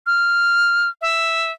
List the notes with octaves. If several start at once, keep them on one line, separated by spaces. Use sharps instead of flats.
F6
E5